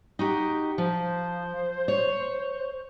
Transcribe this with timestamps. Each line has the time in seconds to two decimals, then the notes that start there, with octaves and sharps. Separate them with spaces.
0.19 D#4 F#4 G4
0.78 F3 C5
1.88 C#5